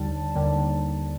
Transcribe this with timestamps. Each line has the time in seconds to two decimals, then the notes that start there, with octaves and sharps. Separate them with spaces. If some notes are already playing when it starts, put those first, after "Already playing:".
Already playing: D#2 D3 G3 A5
0.35 D#2 D3 G3 A#3